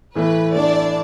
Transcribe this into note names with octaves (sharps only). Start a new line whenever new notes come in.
A2 E3 A3 B4
A2 E3 A3 D4 D5